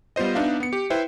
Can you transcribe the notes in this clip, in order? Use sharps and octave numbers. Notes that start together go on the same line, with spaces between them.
G3 B3 F4 C5 D#5
B3 D4 D#4 E5 F5
B3 C#7
G4
E4 B4 C5 E5 G5